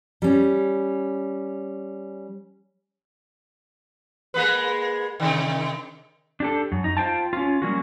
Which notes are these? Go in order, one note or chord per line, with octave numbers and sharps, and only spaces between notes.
G3 C#4
G#3 A#3 B4
C3 D#3
D4 G4 A4
F#2
D#4
F4 C5 G5 A5
C#4 F4
F#3 G3 A#3 C#4 F#4